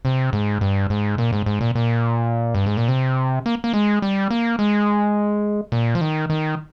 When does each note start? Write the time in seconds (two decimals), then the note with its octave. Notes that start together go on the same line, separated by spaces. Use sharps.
0.05 C3
0.33 G#2
0.61 G2
0.90 G#2
1.18 A#2
1.32 G#2
1.46 G#2
1.61 A#2
1.75 A#2
2.55 G2
2.66 G#2
2.77 A#2
2.88 C3
3.46 A#3
3.64 A#3
3.74 G#3
4.02 G3
4.31 A#3
4.59 G#3
5.72 A#2
5.95 F3
6.01 D#3
6.30 D#3